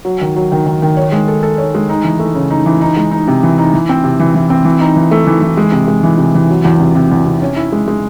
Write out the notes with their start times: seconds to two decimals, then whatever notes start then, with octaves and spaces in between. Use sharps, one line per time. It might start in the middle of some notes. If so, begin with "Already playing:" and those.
0.05 F#3
0.21 D#3
0.36 F#3
0.52 D#3
0.66 D#3
0.82 D#3
0.97 C#5
1.12 G#3
1.28 A4
1.43 A4
1.58 C#5
1.75 G#3
1.89 D#4
2.04 E3
2.19 A3
2.35 C#3
2.51 D#4
2.66 E3
2.81 D#4
2.97 G#3
3.11 D#4
3.28 C3
3.43 E3
3.58 D#4
3.74 E3
3.89 C4
4.04 C3
4.20 E3
4.35 E3
4.50 C4
4.65 E3
4.80 D#4
4.96 E3
5.11 A3
5.27 E3
5.42 E3
5.57 G#3
5.72 C3
5.88 G#3
6.03 E3
6.18 C3
6.34 E3
6.50 F#3
6.65 E2
6.80 C3
6.95 C3
7.11 E2
7.26 C3
7.42 C#4
7.56 E4
7.72 G#3
7.88 G#3